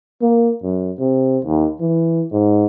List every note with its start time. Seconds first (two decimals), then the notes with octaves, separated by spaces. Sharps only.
0.22 A#3
0.63 F#2
0.99 C3
1.45 D#2
1.80 E3
2.32 G#2